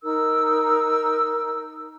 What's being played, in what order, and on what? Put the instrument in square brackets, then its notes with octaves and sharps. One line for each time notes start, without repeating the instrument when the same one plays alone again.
[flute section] D#4 A#4 E6